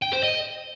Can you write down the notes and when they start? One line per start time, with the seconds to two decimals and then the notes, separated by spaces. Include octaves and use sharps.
0.02 G5
0.13 C5
0.23 D#5